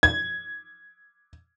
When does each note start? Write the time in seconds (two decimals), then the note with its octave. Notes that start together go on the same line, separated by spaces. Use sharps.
0.03 G#6